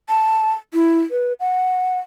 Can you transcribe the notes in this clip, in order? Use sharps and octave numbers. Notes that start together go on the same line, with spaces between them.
A5
E4
B4
F#5